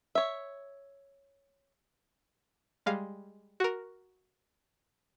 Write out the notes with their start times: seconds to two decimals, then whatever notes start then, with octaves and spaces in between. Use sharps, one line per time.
0.15 C#5 E5
2.86 G3 G#3 F5
3.60 F#4 A#4